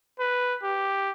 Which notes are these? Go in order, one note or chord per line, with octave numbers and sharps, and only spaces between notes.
B4
G4